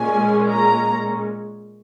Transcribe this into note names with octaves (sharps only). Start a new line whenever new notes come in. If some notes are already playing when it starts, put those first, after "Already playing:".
Already playing: A#2 G#3 C#4 G#5
A#5